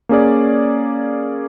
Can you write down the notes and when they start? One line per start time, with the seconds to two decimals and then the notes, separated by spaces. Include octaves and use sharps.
0.09 A#3 C#4 G#4 D5